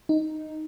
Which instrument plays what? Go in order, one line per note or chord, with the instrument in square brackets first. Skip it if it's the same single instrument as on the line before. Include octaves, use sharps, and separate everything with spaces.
[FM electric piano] D#4